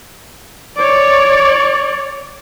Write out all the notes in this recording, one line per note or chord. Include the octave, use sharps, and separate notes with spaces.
C#5 D5